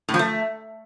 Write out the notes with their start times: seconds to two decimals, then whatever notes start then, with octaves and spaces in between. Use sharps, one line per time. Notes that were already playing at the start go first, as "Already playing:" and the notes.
0.09 A2
0.14 F3
0.19 A3